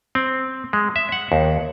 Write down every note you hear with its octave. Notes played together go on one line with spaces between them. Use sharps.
C4
G#3
E5
F#5
D#2